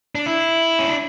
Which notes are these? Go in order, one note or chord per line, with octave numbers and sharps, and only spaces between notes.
D4
E4
C#4
D4